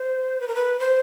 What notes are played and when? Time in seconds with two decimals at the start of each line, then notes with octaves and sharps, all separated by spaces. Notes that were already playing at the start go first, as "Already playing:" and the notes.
Already playing: C5
0.40 B4
0.48 A#4
0.55 B4
0.80 C5